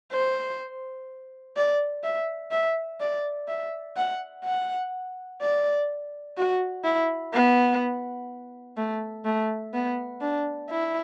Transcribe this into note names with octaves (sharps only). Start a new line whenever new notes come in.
C5
D5
E5
E5
D5
E5
F#5
F#5
D5
F#4
E4
B3
A3
A3
B3
D4
E4